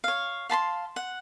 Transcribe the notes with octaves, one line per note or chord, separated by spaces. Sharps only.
C#5 F5
F5 A5 B5 C6
F#5